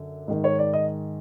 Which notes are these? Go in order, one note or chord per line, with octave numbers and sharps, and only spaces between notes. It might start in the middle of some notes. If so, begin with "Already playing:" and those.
Already playing: F#2 D3
G#2 D#3
C#5
D5
D#5